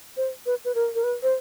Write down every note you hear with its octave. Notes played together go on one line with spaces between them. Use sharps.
C5
B4
B4
A#4
A#4
B4
C5